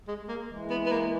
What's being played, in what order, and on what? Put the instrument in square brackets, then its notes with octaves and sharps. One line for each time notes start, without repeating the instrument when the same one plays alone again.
[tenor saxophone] G#3
A#3
[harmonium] E3 G#3
[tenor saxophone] B3
B3
A#3